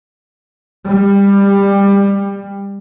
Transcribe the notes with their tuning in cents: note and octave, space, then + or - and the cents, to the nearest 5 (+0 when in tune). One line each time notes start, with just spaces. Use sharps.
G3 +20